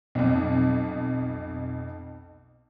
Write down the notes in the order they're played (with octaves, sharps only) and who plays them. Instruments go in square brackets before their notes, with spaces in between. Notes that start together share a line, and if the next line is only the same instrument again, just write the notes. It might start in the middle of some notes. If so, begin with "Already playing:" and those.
[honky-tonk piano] B1 F2